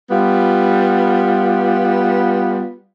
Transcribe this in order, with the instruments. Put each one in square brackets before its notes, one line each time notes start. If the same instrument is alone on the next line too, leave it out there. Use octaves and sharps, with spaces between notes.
[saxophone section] G3 B3 F4